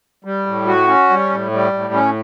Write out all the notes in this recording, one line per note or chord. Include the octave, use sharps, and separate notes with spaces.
G3
A2
F#4
C#4
G3
A2
G3
A2
C#4